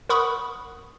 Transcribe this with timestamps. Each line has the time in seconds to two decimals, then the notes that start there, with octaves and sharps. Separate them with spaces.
0.09 A#4 F#5 B5 C#6 D#6 F#6